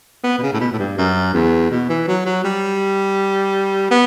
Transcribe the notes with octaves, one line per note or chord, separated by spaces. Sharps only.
B3
B2
C#3
A2
B2
A2
G2
F#2
E2
B2
E3
F#3
F#3
G3
B3